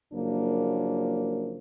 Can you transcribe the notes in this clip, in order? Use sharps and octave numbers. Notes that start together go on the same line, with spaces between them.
F#1 F#2 F3 A#3 D4